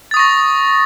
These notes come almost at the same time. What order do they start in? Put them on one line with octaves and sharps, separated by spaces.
A6 D#6 C#6 A#6